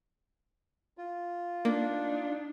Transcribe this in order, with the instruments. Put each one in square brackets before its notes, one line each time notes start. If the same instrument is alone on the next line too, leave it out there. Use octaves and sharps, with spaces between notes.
[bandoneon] F4
[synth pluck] A#3 [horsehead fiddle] D4 D#4 [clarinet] D5